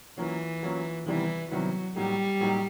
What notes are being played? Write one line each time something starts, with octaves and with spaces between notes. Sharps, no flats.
E3 F#3 A#3 C#4 F4
F#3 A#3 C#4 F4
C3 D#3 E3 G3 B3 E4
C3 D#3 F#3 G3 B3 E4
A2 F#3 G3 A#3 D#4 G4
A2 F#3 A#3 D#4 G4